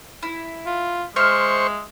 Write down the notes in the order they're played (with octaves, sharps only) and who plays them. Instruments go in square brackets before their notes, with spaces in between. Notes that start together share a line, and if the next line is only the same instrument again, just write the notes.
[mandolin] E4
[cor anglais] F4
[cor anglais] G#3 [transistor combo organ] C5 C#6 [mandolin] E5 F6